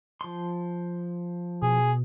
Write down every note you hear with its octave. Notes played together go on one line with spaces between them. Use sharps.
F3 C6
B2 G#4